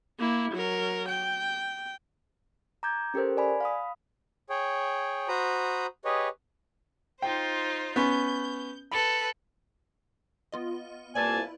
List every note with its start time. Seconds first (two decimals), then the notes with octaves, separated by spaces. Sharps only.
0.19 A#3 E4
0.52 F#3 A#4
1.08 G5
2.83 A#5 D6 G6 G#6
3.14 C#4 G4 A4 A#4 C5
3.37 D5 G#5 B5
3.61 F5 B5 D#6
4.49 G#4 C#5 G5
5.28 F#4 C5 A#5 B5 D#6
6.05 G4 G#4 B4 C#5 D#5
7.22 D#4 F4 C5 G5
7.96 B3 C#4 G6
8.92 A4 B4 B5
10.52 B3 F4 D#5
11.15 C2 A#3 F4 B4 D5 G#5 A5
11.37 E4